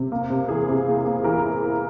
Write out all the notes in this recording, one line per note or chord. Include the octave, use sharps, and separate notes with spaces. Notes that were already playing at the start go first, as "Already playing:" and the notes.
Already playing: C3
A#3
C3
E3 G#4
C3
A#3
A#3
E3 A#4